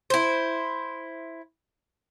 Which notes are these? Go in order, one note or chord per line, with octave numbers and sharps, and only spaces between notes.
E4 C5